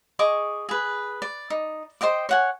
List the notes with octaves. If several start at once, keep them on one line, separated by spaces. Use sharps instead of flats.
G#4 D#5 C#6 D6
G#4 B4
D5
D#4
C5 D#5 G5 D6
C#5 F#5 G#5